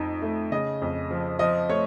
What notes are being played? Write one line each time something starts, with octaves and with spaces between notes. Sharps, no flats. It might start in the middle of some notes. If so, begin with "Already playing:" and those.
Already playing: F2 D#4
A3
C#3 D#5
F2
F3
F3 D#5
A3 C#5